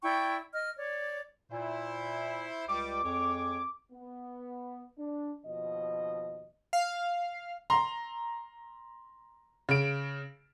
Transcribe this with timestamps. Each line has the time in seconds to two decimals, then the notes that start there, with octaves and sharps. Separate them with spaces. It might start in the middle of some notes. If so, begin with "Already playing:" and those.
0.03 E4 D5 G5 C#6
0.53 D#5 F6
0.77 C#5 D5
1.52 A#2 E4 C5
2.68 C#2 G3 D6
3.04 F2 G#3 G#4 C#5
3.92 B3
4.98 D4
5.46 D#2 B2 F3 D#5
6.73 F5
7.70 A#5 C6
9.69 C#3 D7